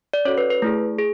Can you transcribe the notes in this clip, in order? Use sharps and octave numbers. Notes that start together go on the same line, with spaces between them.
D5
C#4 F#4 A4 C#5
B4
B4
A3 E4 G#4
G#4